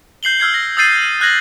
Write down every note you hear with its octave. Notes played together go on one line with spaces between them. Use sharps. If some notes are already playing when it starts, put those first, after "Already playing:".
G6 C7 F#7 G7
E6 F6 G#6 C7
A#6
D#6 E6 G6 A6 C7 D#7
D#7
F6 F#6 G#6 A#6 F#7